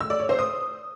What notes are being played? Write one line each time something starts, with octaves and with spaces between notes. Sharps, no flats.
E6
D5
C#5
C5
D#6